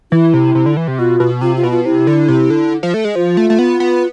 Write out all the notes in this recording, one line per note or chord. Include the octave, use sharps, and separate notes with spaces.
E3 E4
C3
C3
D3
E3
C3
B2 F4
B2
C3 F4
F4
B2
F4
C3 E4
D3
C3
D3
F3
A3
G#3
F3 F4
A3
A3
B3
B3